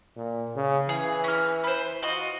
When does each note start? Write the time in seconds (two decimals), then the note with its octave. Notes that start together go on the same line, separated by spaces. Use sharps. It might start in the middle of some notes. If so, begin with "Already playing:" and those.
0.16 A#2
0.56 C#3
0.89 E3 G#4
1.24 C#4 F6
1.64 B4 C5
2.02 F4 F#4 D#5